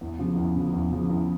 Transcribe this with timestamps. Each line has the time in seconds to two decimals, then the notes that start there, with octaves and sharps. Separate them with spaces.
0.01 E2
0.19 C#3 F3
0.37 E2
0.56 C#3 F3
0.74 E2
0.92 C#3 F3
1.10 E2